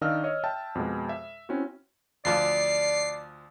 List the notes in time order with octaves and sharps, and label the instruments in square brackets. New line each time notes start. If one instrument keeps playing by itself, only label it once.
[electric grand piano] D#3 D4 D#5 F5 E6 F6
C#5 D#5
E5 G5 A5
F2 B2 G#3
E5
C4 C#4 E4 F#4
[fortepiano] D2 F3 D6 [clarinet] D5 [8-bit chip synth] C7